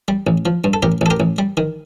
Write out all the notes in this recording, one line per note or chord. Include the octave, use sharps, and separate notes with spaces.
G3
A1
F3
G2
A4
A1 G4 A#4
A1 A4
G4 A#4
A1
G3
D#3